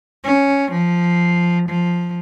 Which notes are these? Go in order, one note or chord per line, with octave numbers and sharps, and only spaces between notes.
C#4
F3
F3